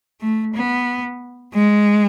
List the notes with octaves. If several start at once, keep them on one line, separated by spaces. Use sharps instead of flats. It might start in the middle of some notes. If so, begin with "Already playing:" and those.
A3
B3
G#3